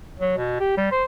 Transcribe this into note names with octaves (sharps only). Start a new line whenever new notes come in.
F#3
B2
G4
G3
C5